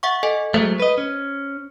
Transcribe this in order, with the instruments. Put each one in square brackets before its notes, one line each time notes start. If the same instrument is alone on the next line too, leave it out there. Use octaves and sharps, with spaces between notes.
[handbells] E5 F#5 C#6
A4 D#5 G#5
[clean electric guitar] F#3 G#3 A3 [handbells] C5
[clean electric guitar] B4 D#5
C#4